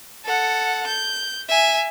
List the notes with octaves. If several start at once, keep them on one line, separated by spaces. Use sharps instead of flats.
A4 F#5
G6
E5 G#5